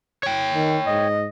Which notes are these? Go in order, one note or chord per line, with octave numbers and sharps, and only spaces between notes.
C#5 G5
D#3
G#2 D#5